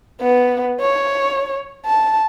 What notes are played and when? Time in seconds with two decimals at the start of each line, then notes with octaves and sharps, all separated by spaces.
0.20 B3
0.81 C#5
1.86 A5